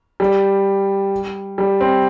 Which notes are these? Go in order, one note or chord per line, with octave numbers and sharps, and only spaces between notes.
G3
G3
C4